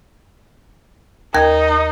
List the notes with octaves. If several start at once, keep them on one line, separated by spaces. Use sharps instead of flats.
D#2 D#4 A#4 G#6